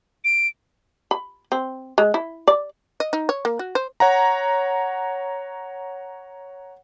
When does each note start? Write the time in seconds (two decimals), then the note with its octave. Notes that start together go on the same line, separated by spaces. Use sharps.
0.25 D7
1.11 B5
1.52 C4
1.98 G#3
2.14 E4
2.48 D5
3.00 D#5
3.13 D#4
3.29 C#5
3.45 A#3
3.59 F#4
3.75 C5
4.00 C#5 F#5 A#5